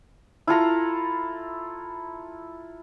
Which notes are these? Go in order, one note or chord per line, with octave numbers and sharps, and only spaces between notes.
E4 F4 A4 A#5